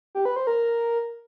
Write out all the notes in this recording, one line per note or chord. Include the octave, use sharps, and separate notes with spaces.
G4
B4
C5
A#4